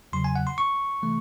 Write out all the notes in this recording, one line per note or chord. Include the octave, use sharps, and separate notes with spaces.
E2 C#3 F#3 C6
G#5
F#5
C6
C#6
C3 E3 A3